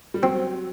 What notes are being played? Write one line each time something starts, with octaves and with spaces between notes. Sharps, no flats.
G3
F#3 C4